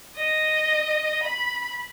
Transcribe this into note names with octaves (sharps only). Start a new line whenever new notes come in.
D#5
B5